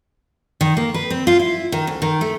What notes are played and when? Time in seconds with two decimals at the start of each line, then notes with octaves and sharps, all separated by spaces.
0.61 D#3
0.77 A#3
0.94 B4
1.10 C4
1.27 F4
1.40 E4
1.72 D#3
1.87 D2
2.02 D#3
2.21 A3